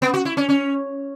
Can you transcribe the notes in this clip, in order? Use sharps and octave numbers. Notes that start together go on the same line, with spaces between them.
B3
F#4
E4
C#4
C#4